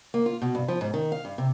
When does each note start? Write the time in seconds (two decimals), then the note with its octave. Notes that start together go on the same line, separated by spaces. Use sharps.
0.14 A#3
0.26 F4
0.42 B2
0.55 G2
0.68 F3
0.81 G#2
0.94 D#3
1.12 F5
1.25 G2
1.38 C3